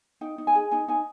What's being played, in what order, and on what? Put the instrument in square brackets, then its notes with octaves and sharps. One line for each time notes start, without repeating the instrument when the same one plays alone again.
[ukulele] D#4 G5
D#4
G#5
G#4
D#4 G#5
D#4 G#5